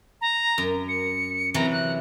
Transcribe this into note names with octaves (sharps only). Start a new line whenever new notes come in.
A#5
F#2
C#7
C3 E3 F#3 A#5
F#6